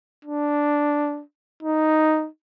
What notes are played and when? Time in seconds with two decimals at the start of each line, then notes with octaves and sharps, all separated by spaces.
0.25 D4
1.63 D#4